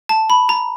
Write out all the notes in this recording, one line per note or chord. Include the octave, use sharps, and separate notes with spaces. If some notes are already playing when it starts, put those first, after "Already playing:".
A5
B5
A#5